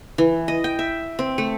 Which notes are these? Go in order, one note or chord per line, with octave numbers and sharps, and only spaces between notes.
E3
D#5
G5
E5
C4
A3